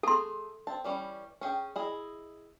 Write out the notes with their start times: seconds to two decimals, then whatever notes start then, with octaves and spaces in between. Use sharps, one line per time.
0.03 A3 G#4 A4 C6
0.67 C4 A5
0.85 E3 G3 C#4
1.41 C#4 G#4 G5
1.76 E4 G#4 D#5